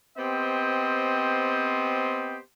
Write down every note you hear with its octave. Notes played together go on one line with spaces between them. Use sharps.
B3 C4 G4 C5 D#5